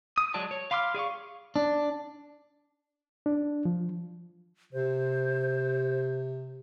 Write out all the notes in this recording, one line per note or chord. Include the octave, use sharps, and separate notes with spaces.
D#6
F#3 G#3 D5 A5
C#5
F5 B5 C6 D6 F6
G#4 D5 F5 C#6
D4
D4
F3
C3 C5